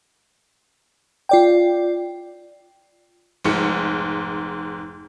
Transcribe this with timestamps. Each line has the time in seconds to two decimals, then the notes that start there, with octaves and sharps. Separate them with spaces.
1.29 F4 D5 G5
3.44 F1 G#2 C#7